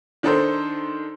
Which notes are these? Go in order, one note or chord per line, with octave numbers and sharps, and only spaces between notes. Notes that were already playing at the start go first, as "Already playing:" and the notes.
D#3 D4 D#4 A4 C5